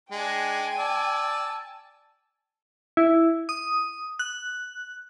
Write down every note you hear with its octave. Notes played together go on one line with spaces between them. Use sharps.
G#3 D4 G5 G#5
D5 A5 E6
E4
D#6
F#6